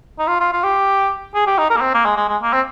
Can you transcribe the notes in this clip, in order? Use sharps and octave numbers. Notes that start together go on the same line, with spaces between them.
D#4
F4
F4
F4
G4
G#4
G4
D#4
A#4
A#3
C4
A#3
G#3
G#3
G#3
A#3
C4